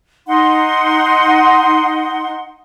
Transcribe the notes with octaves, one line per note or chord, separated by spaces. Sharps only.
D#4 F#5 C6